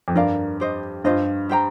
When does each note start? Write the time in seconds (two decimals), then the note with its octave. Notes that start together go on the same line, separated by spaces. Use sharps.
0.08 F2
0.15 G2 A#4 D5 F5
0.60 G4 C5 D#5
1.04 G2 F4 C5 D#5
1.49 G4 C5 G5 A#5